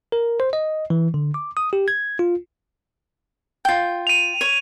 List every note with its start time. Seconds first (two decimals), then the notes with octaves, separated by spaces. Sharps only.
0.12 A#4
0.40 C5
0.53 D#5
0.90 E3
1.14 D3
1.34 D6
1.57 D#6
1.73 G4
1.88 G#6
2.19 F4
3.65 F4 G5
4.07 D#7 F7
4.41 C#5